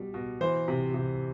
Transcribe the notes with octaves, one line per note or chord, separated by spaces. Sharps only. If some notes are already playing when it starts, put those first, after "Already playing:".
Already playing: B2 G3
B2
E3 C5
C3
C3